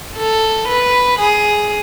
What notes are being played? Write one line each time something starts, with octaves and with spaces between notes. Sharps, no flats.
A4
B4
G#4